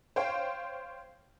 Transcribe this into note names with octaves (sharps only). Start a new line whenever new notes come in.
C5 C#5 F5 G5